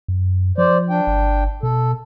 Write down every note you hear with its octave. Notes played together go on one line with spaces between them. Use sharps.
F#2
F3 C5 D5
D4 G5
G1
B2 A4